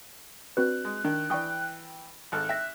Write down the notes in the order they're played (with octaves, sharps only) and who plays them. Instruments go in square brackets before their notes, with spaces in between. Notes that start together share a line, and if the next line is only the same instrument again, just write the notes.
[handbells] C4 F#4 B4 [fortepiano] D4 [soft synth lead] F#6
[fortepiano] G#3
[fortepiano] D#3 [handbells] D4
[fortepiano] E3 G5 [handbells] D5 C#6 D#6
[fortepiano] G#1 A4 F6 [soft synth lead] F#6
[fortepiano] E5 [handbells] G5 A#6